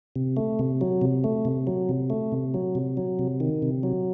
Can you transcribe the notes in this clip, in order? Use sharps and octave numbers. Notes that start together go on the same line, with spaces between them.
C3
A3
C3
F#3
C3
A3
C3
F#3
C3
A3
C3
F#3
C3
F#3
C3
D#3
C3
F#3